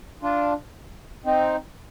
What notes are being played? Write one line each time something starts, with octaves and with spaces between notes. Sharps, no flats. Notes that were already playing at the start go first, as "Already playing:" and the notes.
D4 F4
C4 D#4